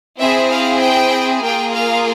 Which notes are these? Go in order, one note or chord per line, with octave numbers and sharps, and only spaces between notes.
C4 E4 G#4 E5
F5
G5
A#3 F4 G#4 G5
F5